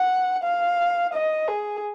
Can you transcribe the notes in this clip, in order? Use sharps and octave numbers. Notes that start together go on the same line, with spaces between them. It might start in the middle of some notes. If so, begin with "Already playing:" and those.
Already playing: F#5
F5
D#5
G#4